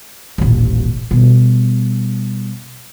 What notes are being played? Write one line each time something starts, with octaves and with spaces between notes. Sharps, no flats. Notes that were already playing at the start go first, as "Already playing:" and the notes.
D#1 A1
B2 G3